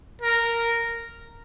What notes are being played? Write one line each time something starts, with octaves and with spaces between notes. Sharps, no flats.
A#4